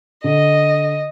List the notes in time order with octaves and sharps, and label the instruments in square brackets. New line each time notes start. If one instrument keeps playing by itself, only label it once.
[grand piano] D3 [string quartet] D#5